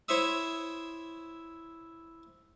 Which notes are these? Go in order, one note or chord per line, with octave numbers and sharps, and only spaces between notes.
E4 C5 C#5 E5 D#6